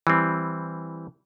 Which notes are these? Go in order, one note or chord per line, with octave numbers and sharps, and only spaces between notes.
E3 G3 C4